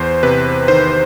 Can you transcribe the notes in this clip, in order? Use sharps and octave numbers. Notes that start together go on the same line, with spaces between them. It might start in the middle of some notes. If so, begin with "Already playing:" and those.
Already playing: E2 C5
C3 B4
D#3 C5